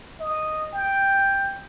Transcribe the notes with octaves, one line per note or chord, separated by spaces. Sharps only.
D#5
G5